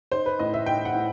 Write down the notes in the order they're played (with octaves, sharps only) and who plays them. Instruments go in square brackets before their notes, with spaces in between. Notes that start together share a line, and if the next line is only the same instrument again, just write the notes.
[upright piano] D#4 C5
B4
A2 D#5
E5
D#4 G5
F#5
A2